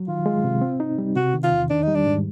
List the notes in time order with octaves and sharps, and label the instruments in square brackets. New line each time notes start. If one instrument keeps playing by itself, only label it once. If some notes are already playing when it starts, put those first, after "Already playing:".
Already playing: [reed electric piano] F#3
[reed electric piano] D#3 [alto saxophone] F4
[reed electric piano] G#3
C3
C4
D#4
G3
[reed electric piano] C3 [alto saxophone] F#4
[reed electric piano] D#3
[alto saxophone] F4
[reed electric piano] E2
[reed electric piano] D#3 [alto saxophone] D4
[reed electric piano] G3 [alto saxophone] D#4
[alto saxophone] D4
[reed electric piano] G#2